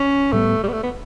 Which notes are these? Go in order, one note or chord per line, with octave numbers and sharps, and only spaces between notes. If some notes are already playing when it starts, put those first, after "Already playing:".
Already playing: C#4
A2 G3 A3 B3
G3
B3
A3
B3